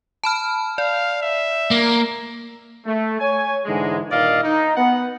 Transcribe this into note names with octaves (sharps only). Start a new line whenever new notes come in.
A5 B5 F6
D5 F5
E5
A#3
A3
C#5 G#5
G#2 D3 E3 G#3
G2 A#2 D#3 D5 D#5 F5
D#4
B3 F#5